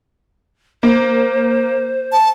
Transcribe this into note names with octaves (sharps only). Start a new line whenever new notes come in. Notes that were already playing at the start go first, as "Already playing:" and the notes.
A#3 C5
A5